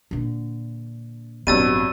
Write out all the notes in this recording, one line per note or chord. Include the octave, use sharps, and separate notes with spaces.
A#2 D3
A1 G2 B2 F#3 C4 E6 A6 D#7